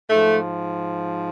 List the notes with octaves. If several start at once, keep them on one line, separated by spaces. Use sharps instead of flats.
G#2 F3 A3